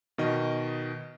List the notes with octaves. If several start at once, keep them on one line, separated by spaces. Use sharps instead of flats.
B2 D#3 D#5 F6